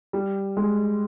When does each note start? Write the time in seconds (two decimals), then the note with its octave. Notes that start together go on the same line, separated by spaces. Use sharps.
0.13 G3
0.57 G#3